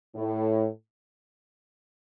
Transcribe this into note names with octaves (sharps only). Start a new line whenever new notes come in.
A2